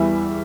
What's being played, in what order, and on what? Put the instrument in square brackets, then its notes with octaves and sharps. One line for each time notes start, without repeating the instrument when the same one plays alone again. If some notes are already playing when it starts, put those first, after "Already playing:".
Already playing: [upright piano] E2 E3 G3 E5